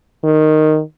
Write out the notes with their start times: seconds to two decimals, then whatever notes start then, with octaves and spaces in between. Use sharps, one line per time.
0.24 D#3